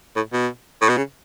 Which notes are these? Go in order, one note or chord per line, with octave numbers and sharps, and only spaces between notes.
A2
B2
A2
B2
C#3